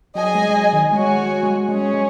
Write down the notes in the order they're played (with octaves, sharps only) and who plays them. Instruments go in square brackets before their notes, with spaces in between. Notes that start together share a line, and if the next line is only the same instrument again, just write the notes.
[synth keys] F#3 [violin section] G#4 D#5 G#5
[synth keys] G#3
G#3
F#3
D#3
[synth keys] G#3 [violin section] F#4 C#5 G#5
[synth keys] G#3
G#3
[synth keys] G#3 [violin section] C#4 G#4 C#5
[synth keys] G#3